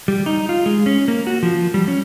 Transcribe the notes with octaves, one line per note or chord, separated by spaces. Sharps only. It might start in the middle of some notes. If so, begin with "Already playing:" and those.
G3
D#4
F4
G#3
C#4
A#3
F#4
F3
G3
C#4